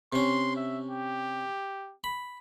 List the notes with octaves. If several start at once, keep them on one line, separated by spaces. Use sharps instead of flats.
C3 C#4 C6
E5
G4
B5